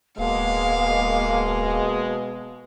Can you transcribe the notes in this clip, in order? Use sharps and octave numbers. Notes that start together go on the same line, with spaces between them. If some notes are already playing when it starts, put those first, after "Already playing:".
D1 B2 G#3 A#3 F5